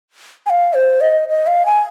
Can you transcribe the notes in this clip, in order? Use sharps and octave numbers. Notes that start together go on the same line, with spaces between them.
G#5
F5
C5
D#5
D#5
F5
G#5